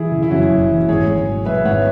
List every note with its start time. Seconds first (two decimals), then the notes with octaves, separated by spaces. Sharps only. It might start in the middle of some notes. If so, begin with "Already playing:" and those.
Already playing: E3 E4 G#4
0.12 C#3
0.22 E4
0.30 F#2 C#4 F#4
0.50 F#1
0.69 E3
0.88 G#1 G#4 C#5
1.07 G#1
1.27 F#3
1.46 G#2 B4 E5
1.65 G#1 C#5 F#5